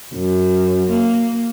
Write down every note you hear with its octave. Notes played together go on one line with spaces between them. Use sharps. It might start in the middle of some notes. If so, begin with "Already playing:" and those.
F#2
A#3